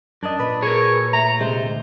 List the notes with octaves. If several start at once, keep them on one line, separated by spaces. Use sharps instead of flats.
F#2 D4 D#5
A#2 B4
G#4 A#4 C#5
A3 A#5
C3 G#3 C5
D2